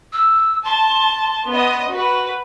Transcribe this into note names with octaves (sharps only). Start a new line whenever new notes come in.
E6
A5 C6
B3 D#5
F#4 B4